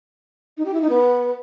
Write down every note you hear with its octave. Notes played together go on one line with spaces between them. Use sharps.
D#4
G4
E4
D#4
B3